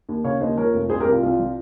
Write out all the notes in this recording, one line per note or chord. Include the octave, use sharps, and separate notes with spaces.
D#2
C#3 C#5 F5
D#2 C5 D#5
F3 A#4 C#5
F1
C2 G#4 C5
G4 A#4
C2
F4
C2 F4
F3